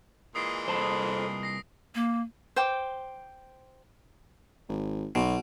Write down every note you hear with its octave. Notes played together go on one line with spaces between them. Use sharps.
A#2 E3 G#3 D#6 C7 D7
C2 A4 C5 A5 B5
D#6
A#6 C7
A#3
C5 G5 D6
G#1
B1 B2